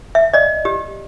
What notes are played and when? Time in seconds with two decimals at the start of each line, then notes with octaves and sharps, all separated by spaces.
0.15 E5
0.33 D5 D#5
0.65 G4